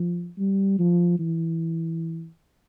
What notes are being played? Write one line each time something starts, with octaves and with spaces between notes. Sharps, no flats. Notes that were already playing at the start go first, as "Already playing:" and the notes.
Already playing: F3
G3
F3
E3